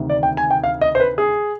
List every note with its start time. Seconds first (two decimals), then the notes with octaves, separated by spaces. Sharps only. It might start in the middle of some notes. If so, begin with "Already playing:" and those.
Already playing: D2 C3 D#3
0.10 D5
0.23 G5
0.37 G#5
0.50 G5
0.64 F5
0.81 D#5
0.95 C5
1.00 B4
1.18 G#4